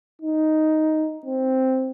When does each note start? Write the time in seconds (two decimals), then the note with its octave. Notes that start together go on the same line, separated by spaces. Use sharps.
0.22 D#4
1.26 C4